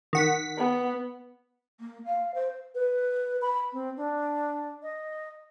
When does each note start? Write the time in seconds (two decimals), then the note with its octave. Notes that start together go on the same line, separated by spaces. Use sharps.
0.13 D#3 F#5 B6
0.58 B3
1.80 A#3
2.06 F5
2.35 C5
2.75 B4
3.42 B5
3.72 C4
3.96 D4
4.82 D#5